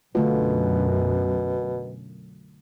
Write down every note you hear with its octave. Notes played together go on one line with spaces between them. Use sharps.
B1 F#2 B2 D3 A3 F4